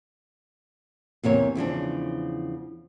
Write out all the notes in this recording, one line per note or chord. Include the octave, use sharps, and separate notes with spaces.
E2 C3 A#3 C#5
E2 C#3 F3 D4